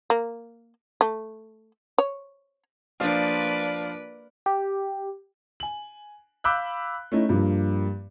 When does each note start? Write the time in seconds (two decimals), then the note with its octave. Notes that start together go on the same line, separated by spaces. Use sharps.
0.10 A#3
1.01 A3
1.98 C#5
3.00 F3 A#3 D4 F4 B4 D5
4.46 G4
5.60 G#5 F#7
6.44 F5 B5 D6 E6 F#6 G6
7.12 A3 C#4 D#4 E4
7.29 G2 F3 G3 A#3